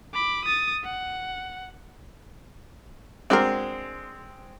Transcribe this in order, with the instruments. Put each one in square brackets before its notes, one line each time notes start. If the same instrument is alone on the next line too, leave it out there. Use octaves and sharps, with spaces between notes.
[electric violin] B5 D6
D#6 A6
F#5
[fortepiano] G#3 C4 [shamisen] D4 F#4 A#4